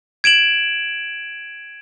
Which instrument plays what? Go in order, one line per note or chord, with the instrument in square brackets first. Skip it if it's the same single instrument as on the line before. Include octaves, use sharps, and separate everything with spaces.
[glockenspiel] G#6 D7 E7 F#7